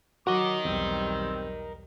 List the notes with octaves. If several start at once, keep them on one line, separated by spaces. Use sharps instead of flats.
F#3 F#4 A#4 D#5 D6
B1 E2 G3 C4